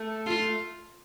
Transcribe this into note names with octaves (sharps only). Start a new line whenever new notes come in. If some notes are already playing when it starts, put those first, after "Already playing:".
Already playing: A3
F4